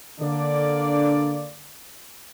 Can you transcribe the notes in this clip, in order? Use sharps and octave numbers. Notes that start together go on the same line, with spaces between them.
D3 A#3 D4 D5